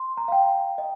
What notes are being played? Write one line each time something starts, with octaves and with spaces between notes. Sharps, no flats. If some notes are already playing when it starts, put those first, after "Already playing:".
Already playing: C6
A#5
F5
G5
D#5